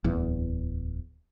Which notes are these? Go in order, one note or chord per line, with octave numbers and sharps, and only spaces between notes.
D1 E2